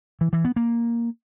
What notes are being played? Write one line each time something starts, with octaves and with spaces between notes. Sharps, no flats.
E3
E3
B3
A#3